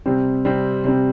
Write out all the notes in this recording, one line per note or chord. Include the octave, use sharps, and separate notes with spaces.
C3 G3 C4
C3 G3 C4
C3 G3 C4